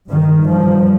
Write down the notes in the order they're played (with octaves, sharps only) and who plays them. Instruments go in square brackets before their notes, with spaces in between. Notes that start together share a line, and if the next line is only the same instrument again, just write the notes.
[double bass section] G2 D#3
F3